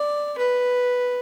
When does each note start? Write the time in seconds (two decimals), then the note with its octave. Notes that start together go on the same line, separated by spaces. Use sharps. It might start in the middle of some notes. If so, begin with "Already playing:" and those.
Already playing: D5
0.38 B4